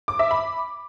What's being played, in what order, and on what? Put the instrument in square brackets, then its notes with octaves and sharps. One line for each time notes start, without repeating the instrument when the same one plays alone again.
[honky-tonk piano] D6
E5
B5